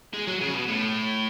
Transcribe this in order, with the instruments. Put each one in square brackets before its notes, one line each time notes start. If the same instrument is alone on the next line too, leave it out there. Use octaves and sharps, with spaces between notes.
[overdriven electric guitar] G#3
F#3
C#3
B2
A2